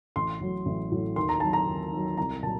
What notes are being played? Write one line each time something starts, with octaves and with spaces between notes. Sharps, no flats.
A1 C6
A2 F#3
A1
A2 F#3
D#2 C6
A#5
D#3 F#3 A5
A#5
D#2
D#3 F#3
C2 A#5
A#2 F#3 A5